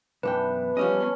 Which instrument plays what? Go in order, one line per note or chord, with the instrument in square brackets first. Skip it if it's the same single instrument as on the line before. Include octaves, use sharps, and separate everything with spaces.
[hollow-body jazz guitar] B1 F#2 G5 [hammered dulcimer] E3 B3 D4 [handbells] B4
[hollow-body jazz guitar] F3 G3 D#5 [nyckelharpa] C#4